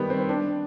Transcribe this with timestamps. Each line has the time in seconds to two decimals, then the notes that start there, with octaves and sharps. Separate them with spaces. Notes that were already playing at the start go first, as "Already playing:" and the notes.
Already playing: D#3 G3 B3
0.10 C4
0.29 D4